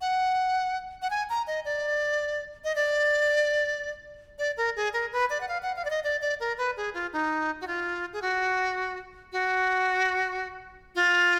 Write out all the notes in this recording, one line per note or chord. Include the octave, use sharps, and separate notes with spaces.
F#5
F#5
G#5
A#5
D#5
D5
D#5
D5
D5
A#4
G#4
A#4
B4
D5
F#5
F5
F#5
F5
D5
D#5
D5
D5
A#4
B4
G#4
F4
D#4
F#4
F4
G#4
F#4
F#4
F4